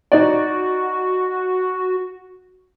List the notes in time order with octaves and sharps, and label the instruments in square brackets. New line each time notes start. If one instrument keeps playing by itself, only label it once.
[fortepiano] D#4 D5 [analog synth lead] F#4